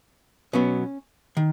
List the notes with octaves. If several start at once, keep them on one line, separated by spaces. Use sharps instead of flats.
B2 F#3 B3 C#4
D#3